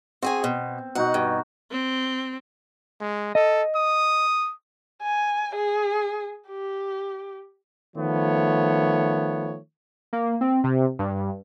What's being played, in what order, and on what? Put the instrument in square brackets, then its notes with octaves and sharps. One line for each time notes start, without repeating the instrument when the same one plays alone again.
[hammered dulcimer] C4 [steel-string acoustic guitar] F#4 G#4 G#5
[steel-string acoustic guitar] B2
[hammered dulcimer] B2 D#4 F#4 [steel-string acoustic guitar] F#5
[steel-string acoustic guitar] G2
[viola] C4
[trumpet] G#3
[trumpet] A4 [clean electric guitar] D#5
[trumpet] D#6
[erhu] G#5
G#4
G4
[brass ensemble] D#3 F3 A3 B3 C#5
[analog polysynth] A#3
C4
C3
G2